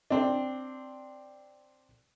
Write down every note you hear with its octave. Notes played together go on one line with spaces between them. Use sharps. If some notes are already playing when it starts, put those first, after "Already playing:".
C4 D4